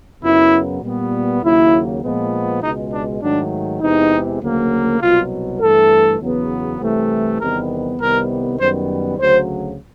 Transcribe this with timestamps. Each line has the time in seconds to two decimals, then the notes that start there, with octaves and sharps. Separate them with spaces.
0.23 F#2 C#3 F#3 B3 E4
0.83 A#2 G3 B3
1.42 D#2 C#3 F#3 A#3 E4
2.02 A#2 F3 G#3 B3
2.62 C#2 B2 G#3 D#4
2.92 D4
3.21 G#2 D#3 F#3 A3 D4
3.81 E2 C3 E3 G#3 D#4
4.41 D2 C#3 F#3 A#3
5.00 C2 B2 F#3 F4
5.60 G2 E3 A3 A4
6.20 E2 C#3 F#3 B3
6.80 C2 C3 E3 A3
7.40 E2 C3 D#3 G3 B3 A#4
7.99 C2 C3 D#3 G3 B3 A#4
8.59 F#2 D#3 G3 B3 C5
9.19 D2 C#3 F#3 C5